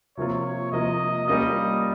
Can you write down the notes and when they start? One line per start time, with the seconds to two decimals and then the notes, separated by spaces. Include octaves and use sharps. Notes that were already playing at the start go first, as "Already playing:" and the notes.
0.17 C3 F3 A#3 F4 C#5
0.72 C3 F3 A#3 F4 D#5
1.27 G3 A#3 C#4 F4 D#5